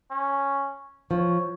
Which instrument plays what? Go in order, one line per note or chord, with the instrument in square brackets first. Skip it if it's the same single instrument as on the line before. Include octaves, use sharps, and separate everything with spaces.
[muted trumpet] C#4
[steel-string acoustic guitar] F3 [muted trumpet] C#5